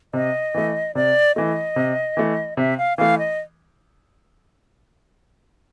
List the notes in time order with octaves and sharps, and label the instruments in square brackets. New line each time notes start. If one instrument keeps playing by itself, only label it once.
[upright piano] C3 [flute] D#5
[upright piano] E3 A3
[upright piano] C3 [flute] D5
[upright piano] E3 A3 [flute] D#5
[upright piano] C3
E3 A3
[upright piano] C3 [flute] E5
[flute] F5
[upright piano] E3 A3 [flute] F5
[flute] D#5